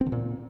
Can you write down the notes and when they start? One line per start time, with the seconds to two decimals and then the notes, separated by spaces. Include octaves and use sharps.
0.01 C4
0.06 D3
0.12 A#2